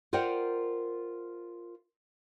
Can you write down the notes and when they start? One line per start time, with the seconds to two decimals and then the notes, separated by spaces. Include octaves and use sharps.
0.13 F4 A#4 C5 D5 F#5 G5